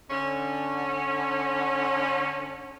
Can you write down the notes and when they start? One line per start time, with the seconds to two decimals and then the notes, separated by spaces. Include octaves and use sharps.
0.11 D3 C#4